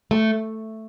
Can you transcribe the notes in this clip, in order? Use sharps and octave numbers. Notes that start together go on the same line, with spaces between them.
A3